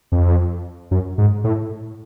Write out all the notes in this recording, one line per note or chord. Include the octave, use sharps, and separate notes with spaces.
F2
F#2
G#2
A2